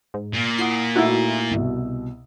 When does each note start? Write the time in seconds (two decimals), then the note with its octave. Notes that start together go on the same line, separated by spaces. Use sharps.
0.14 G#2
0.33 A#2
0.58 E4 F#5 D#6 C7
0.96 A3 D#4 E4 F#4 E6
1.51 C2 B2